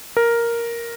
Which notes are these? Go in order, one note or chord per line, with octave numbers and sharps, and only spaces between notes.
A#4